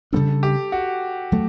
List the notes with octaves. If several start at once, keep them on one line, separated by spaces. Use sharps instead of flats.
C#3 G3 B3 D4 A4
G4
F#4
F#3 A3